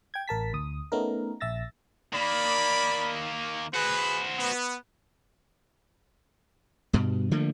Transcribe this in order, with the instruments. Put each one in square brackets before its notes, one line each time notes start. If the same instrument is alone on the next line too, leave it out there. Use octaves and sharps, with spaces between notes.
[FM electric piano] G5 G#6
A1 A#4 A5 B6
D2 D#6
A3 B3 C#4 D#4 A#4
A#1 E5 E6 A6 A#6
[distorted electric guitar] D#3 A#3 [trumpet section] D5 B5
[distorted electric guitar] F#4 C5 [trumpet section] G#4 B4
[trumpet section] B3
[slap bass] G2 B2
D3 F3 A3 A#3